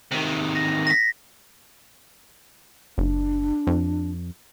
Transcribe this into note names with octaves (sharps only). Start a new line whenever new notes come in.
C3 D#3
A#6
A#6 B6
F#1 D4
F2